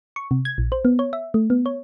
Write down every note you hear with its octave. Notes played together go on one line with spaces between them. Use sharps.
C#6
C3
G#6
A#1
C5
B3
C#5
E5
A3
B3
C#5